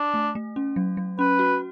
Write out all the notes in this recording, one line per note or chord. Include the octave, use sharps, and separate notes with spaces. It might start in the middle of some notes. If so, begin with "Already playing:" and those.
Already playing: D4
A3
A3
C#4
F#3
F#3
C#4 B4
F#4